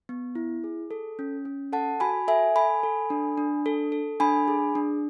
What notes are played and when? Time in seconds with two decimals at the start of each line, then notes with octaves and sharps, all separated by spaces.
0.09 B3
0.35 E4
0.64 G#4
0.91 A4
1.19 C#4
1.45 C#4
1.73 A4 F#5 A5
2.00 F#4 G#5 B5
2.28 A4 E5 G#5
2.56 A4 G#5 B5
2.83 A4
3.10 D4
3.38 D4
3.66 A4
3.92 A4
4.20 D4 G#5 B5
4.48 G#4
4.75 D4